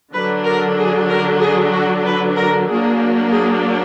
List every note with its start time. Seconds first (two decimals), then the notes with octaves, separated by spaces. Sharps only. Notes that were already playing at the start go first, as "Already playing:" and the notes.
0.13 D3 F#3 D4 B4
0.45 A#4
0.78 G#4
1.09 A#4
1.41 G#4
1.73 F#4
2.05 B4
2.36 A#4
2.68 F#3 A#3 D4 G#4
3.32 G#4